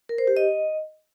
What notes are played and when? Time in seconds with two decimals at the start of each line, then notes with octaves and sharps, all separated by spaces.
0.09 A#4
0.18 C5
0.27 G4
0.37 D#5